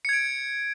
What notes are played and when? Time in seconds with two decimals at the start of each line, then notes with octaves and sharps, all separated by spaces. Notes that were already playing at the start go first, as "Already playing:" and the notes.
0.05 C#7
0.09 G#6
0.13 D7